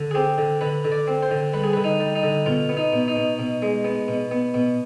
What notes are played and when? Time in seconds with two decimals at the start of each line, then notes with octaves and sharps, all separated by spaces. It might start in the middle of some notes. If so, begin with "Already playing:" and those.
Already playing: D3
0.11 G#4
0.15 C4 G4
0.38 D3
0.61 D3 B4
0.84 D3
0.92 D5
1.07 C4
1.22 C5
1.31 D3
1.53 G3 B4
1.64 G#4
1.73 D3 B4
1.84 D#4
2.00 G3
2.15 D#4
2.23 D3
2.46 B2 F4
2.69 B3
2.77 D#4
2.93 B2
3.08 D#4
3.16 B2
3.39 B2
3.62 G#3
3.84 B3
4.08 B2
4.31 B3
4.54 B2